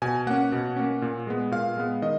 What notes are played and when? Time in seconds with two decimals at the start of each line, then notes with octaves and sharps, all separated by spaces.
0.02 B2 G#5
0.27 A#3 C#4 F#5
0.52 B2
0.76 A#3 C#4
1.02 A#2
1.27 G#3 B3
1.52 A#2 F5
1.77 G#3 B3
2.02 D#3 D#5